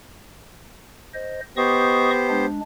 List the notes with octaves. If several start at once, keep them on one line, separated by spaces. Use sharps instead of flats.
C5 D#5
B3 G4 C5 D#5 C#6 D#6
G#3 D4